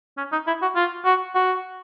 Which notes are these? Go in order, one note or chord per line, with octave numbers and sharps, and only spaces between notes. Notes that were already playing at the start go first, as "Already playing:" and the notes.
C#4
D#4
E4
F#4
F4
F#4
F#4